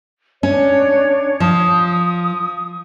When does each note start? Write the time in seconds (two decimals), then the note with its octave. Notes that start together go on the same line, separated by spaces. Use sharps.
0.43 C#4 D4 C#5
1.40 F3 D#6